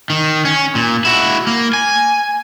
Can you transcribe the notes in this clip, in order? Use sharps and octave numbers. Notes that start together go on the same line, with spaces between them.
D#3
C#4
A#2
E4 F#4
A#3
G#5